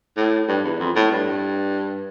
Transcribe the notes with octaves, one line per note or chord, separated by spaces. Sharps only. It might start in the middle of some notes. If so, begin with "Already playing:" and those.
A2
G2
E2
F2
A2
G2